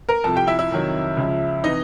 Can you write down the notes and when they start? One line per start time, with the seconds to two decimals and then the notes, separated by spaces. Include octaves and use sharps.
0.09 A#4 A#5
0.24 C2 C3 F3 A4 A5
0.35 G4 G5
0.47 E4 E5
0.59 E4 E5
0.71 F2 C3 D#3 F#3
1.17 C#2 C#3 F3
1.64 C3 E3 D#4 D#5